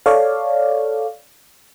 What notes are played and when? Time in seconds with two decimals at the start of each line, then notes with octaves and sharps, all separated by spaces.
0.06 A4 C#5 D5 F5